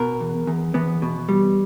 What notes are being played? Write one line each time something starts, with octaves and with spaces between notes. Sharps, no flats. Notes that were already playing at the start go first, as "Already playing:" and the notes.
Already playing: B2 A#4
E2
E2
E2 B3
B2
G3